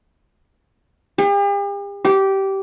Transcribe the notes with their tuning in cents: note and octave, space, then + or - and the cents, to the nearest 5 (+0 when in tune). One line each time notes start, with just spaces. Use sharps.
G4 +45
G4 -15